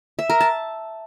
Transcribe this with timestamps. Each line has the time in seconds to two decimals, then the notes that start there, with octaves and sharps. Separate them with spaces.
0.19 E5
0.30 A#4
0.40 A5